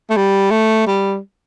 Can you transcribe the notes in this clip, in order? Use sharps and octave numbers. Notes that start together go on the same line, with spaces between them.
A3
G3
A3
G3